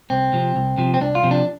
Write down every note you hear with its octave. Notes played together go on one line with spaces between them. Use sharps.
C2 C4
C3 F3
C2
C3 F3
C4
C2 D4
F4
C3 F3
D4